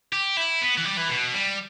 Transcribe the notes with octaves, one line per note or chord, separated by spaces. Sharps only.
G4
E4
B3
E3
G3
E3
B2
G3